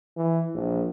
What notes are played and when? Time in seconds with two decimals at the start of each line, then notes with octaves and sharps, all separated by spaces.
0.17 E3
0.54 A#1